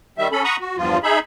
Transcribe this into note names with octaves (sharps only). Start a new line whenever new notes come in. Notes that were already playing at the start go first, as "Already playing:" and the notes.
D#3 G3 E5
C#4 A4 B5
F#5 A#5 B5 C#6 D#6
F#4
E2 G2 F3 F4
D#4 G#4 E5 B5